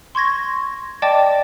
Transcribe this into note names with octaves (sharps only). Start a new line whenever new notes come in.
C6 C#6 G#6 A#6
D5 D#5 G5 A5 D6 A6